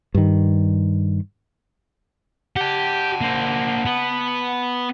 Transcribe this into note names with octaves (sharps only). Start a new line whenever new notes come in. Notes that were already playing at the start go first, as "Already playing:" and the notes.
G2 D#3
G4 F#5 A5
A#3 C5
B3